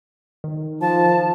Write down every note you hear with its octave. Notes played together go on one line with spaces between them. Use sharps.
D#3
F3 A5